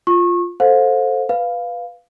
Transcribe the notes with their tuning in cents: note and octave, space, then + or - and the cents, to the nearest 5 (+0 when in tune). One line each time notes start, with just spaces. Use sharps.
F4 +0 C#6 -25
A4 +0 C5 +10 F5 +40
B4 +0 F5 +0